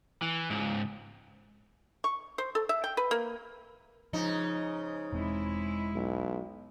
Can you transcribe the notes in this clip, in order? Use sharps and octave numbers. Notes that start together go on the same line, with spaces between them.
E3
C#2 G#2
C#6
C5
A4
E5
G5
B4
A#3
G#2 C#3 F3 D#4
E1 E2 G#3 C4 E4
B1